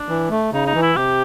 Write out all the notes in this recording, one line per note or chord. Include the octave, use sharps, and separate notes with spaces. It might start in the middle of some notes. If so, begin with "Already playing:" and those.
Already playing: D4
E3
A3
C#3 D#4
D#4
E3
E4
C3 G4